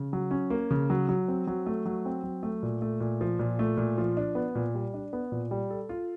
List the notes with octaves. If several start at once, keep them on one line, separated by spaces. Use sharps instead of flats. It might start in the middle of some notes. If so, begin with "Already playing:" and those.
Already playing: C#3
F#3
C#4
A#3
C#3
F#3
F#3
C4
F#3
A3
F#3
C4
F#3
A3
A#2
A3
A#2
F3
A#2
A3
A#2
F3
D4
B3
A#2
G3
D4
B3
A#2
G3
A4
F4